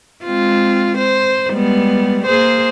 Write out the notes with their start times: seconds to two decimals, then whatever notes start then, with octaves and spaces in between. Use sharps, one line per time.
0.24 G#3 C4 F4
0.98 C5
1.49 G3 G#3 B3
2.26 A#3 G#4 C5